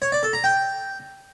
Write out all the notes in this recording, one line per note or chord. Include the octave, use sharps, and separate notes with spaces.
C#5
D5
A4
A#5
G5